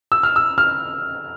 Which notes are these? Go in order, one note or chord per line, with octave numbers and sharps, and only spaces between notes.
E6
F6
E6
F6